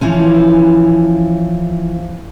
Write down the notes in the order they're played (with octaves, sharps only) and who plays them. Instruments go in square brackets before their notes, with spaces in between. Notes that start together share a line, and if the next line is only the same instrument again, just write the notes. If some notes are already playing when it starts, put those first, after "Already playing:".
[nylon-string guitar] E3 F3 C#4